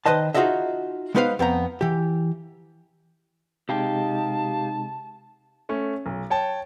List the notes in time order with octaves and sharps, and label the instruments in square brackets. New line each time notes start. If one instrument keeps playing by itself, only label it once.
[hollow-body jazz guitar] D#3 B4 C5 D#5 A5
D#4 F4 F#4 G#4 D#5 E5
G#3 B3 D#4 B4 C5 F5
F2 B3 C5 A#5
E3 G4
[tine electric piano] C3 G#3 [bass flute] D#4 [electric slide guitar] G4 F5 G5 [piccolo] A5
[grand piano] A3 C#4
B1
C#5 G5 A5